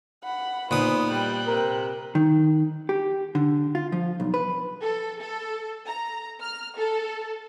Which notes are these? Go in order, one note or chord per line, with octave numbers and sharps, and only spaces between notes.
F#5 B5
A#2 B3 D#4 C5 D#6
G3 G5 F#6
C3 A#4
D#3
G4
D3
F4
F3
B1
B4
A4
A4
A#5
F6
A4